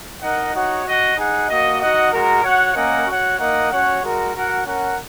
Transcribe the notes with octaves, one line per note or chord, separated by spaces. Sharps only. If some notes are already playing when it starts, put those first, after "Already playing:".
D#4 A#4 D#5 F#5
D#4 F#4 C#5 F#5
F#4 D#5 F#5
D#4 G#4 F#5
A#3 F#4 D#5
D#4 F#4 D#5 F#5
G#3 F#4 A#4
F#4 C#5 F#5
A#3 C#4 A#4 D#5 F#5
F#4 C#5 F#5
A#3 D#4 A#4 D#5 F#5
C#4 F#4 C#5 F#5
G#3 F#4 A#4
F#4 A#4 F#5
C#4 A#4 F#5